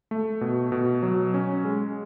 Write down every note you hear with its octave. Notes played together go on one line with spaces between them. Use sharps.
A3
B2
B2
F#3
C#4
G#3